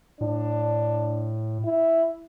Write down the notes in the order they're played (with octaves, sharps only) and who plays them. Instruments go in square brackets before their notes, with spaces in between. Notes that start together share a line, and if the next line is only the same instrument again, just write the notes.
[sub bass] A2 [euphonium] D4
[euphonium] E4